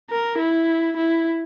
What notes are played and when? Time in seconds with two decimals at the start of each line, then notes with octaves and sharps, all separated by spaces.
0.10 A#4
0.39 E4
0.97 E4